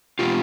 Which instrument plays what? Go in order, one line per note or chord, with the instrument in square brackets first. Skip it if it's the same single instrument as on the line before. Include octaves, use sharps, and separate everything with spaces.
[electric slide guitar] B2 G#3 C4 F4 G4